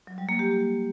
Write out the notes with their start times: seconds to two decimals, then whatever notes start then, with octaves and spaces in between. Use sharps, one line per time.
0.07 F#3
0.18 G3
0.29 A#3
0.39 G4